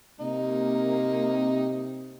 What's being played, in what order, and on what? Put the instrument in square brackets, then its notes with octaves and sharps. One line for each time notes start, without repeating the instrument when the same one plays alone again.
[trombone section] C3 [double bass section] A#3 [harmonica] D#4